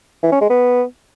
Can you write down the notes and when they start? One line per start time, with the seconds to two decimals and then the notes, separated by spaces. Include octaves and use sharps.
0.23 E3
0.32 C#4
0.41 G#3
0.50 B3